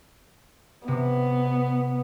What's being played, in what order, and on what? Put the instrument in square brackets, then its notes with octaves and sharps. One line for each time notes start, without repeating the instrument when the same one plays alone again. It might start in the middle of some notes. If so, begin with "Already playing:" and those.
[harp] C3 [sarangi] B3